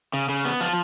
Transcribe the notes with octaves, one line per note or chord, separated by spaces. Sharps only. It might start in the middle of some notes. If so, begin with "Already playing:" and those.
C#3
C#3
B3
F3 F4